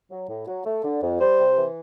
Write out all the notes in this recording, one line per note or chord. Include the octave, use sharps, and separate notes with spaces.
F#3
A2
F#3
A3
D3
F2
G3 C5
C3
E3